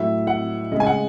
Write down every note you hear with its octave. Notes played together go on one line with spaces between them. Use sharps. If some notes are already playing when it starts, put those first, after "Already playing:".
Already playing: A2 F#3 E5
F#5
C#3 G#3 D#5
G#5
F#5